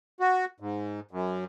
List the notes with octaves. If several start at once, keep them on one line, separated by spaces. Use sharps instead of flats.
F#4
G#2
F#2